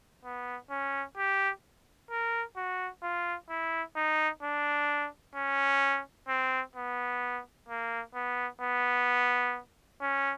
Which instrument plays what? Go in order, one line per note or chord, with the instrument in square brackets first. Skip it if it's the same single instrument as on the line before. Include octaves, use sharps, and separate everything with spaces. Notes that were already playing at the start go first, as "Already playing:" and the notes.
[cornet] B3
C#4
G4
A#4
F#4
F4
E4
D#4
D4
C#4
C4
B3
A#3
B3
B3
C#4